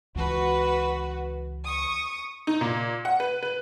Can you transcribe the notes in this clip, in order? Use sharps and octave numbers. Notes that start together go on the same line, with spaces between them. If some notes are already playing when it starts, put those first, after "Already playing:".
C#2 E3 F#4 B4
C#6 D#6
D#4
A#2
F#5
B4
B4